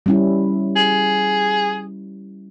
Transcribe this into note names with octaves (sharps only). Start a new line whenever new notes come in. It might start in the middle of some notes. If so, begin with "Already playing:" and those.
G3 C#4 E4
G#4